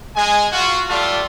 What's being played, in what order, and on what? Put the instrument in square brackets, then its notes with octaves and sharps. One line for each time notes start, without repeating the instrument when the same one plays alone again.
[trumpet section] G#3 G#5
F4 F#4
G3 A3 F4 D5 A5